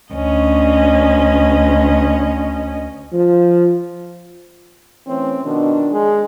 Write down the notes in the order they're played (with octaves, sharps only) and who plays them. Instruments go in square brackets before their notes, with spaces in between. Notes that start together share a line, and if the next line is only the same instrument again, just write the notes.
[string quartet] D2 C#4 D#5
[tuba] F3
[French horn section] E3 A3 C#4 [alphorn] C4
[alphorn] B2 [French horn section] D#3 F3 D4
[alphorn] G#3